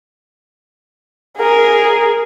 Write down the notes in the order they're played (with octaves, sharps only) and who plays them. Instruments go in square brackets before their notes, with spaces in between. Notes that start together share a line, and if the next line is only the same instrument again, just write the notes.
[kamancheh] G#4 A#4